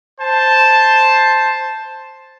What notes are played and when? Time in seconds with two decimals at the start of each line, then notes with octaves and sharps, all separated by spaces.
0.21 C5 A5